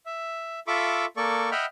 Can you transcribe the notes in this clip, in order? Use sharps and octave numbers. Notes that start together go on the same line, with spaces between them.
E5
F4 A4 E5 B5 C#6 D6
A#3 A4 D5 C#6
D#5 E5 F#5 G5 B5 F6